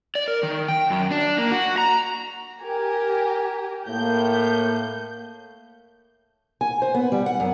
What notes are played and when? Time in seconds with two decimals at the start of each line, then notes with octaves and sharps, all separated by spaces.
0.15 D5
0.28 A#4
0.43 D#3
0.68 G5
0.90 F#2
1.11 D4
1.38 A#3
1.51 F#4
1.78 A#5
2.62 G4 A#4 G#5
3.88 A2 A#3 G6
6.61 G#5
6.82 C5
6.95 B3
7.12 G3
7.26 F#5
7.40 F#2